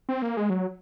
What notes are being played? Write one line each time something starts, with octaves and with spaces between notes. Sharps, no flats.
C4
A#3
G#3
F#3